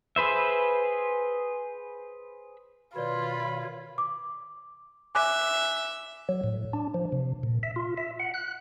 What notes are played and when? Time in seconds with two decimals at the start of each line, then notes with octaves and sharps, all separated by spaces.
0.16 G#4 B4 C5 E5
2.96 B2 D#3 F4 B4 C#5 D5 B5
3.98 D6
5.15 E5 G#5 D6 F#6
6.29 F#3
6.44 A2
6.73 D4
6.94 F3
7.12 C3
7.43 A#2
7.63 E5
7.76 F4
7.98 E5
8.19 F#5
8.34 F#6